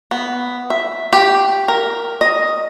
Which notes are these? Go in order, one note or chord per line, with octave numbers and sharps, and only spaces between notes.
B3
E5
G4
A#4
D#5